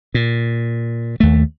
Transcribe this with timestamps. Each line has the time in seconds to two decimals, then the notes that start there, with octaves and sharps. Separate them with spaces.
0.14 A#2
1.20 D#2 A3